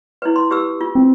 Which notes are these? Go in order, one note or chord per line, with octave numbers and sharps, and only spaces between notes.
E4 B4
C6
G4 B4 E6
F4
C4